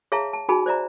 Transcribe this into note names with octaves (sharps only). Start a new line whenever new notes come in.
G#4 C#5 E5 F5 A5 A#5
A5
D#4 F#4 G#4 G#5 A5 B5
C5 D5 E5 A#5